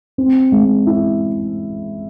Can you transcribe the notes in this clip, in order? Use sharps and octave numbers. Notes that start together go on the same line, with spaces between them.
C4
G#3
E4